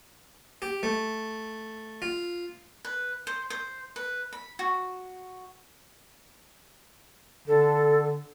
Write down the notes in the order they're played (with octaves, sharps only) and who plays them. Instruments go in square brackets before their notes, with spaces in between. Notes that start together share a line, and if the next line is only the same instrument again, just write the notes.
[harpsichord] G4
A3
F4
[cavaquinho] B4
C5
C5
B4
B5
F#4
[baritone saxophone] D3 [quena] A4